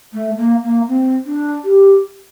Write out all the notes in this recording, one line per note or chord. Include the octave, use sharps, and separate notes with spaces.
A3
A#3
A#3
C4
D4
G4